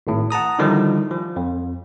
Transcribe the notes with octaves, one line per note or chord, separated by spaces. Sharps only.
G#1 A2
F#5 A5 A#5 D#6
D3 D#3 F3 G3 D#4 E4
F3
F2